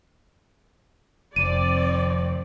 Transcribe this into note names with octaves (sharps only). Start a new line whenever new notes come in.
F1 D#3 F3 C4 D5 D#7